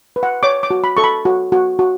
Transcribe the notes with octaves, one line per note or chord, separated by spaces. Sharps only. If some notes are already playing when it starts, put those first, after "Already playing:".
B4
F#5
C#5 D6
D6
F#4
B5
A4 C#6
B5
F#4
F#4
F#4